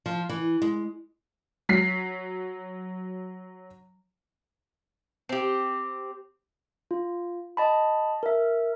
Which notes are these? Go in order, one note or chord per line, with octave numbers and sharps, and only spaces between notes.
F3
E3
G#3
F#3 B6 C7
C4 G4
F4
D#5 A5 B5
A#4 E5